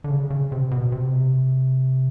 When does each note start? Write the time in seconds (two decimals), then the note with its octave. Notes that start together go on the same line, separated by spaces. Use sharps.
0.04 D3
0.10 C#3
0.30 C#3
0.52 C3
0.71 B2
0.92 C3